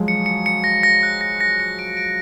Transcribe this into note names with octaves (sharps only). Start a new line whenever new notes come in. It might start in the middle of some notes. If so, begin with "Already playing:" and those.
Already playing: F3 F#3 G#3
C#7
C#7
C#7
A#6
A#6
F#6
A#6
A#6
C#7
D7
D7